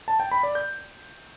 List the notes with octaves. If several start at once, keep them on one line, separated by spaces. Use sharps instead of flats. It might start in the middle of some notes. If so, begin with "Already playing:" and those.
A5
G5
B5
D5
G6